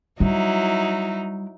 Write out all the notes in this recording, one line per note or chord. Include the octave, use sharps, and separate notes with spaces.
F#3 G3 D#4 E4